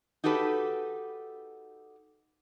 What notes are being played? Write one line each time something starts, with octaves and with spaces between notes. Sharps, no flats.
D#4 F#4 G4 A4 B4